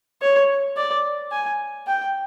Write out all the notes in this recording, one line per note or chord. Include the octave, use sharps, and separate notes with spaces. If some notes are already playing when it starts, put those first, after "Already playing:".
C#5
D5
G#5
G5